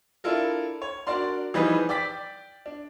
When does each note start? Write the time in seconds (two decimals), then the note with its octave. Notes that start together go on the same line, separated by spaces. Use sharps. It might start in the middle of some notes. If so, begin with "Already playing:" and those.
0.24 D4 E4 F4 A4 A#4
0.82 C#5
1.07 D4 F#4 A#4 D5 C6
1.54 E3 F3 G3 D#4 G#4 B4
1.89 D5 G5 D6 A6 B6
2.66 D4